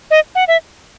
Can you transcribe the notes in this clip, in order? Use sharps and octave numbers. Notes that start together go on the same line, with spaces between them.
D#5
F#5
E5